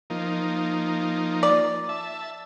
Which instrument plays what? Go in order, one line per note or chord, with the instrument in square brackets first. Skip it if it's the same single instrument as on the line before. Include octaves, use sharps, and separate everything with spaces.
[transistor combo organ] F3 A#3 D#4
[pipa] D5
[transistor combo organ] E5 A5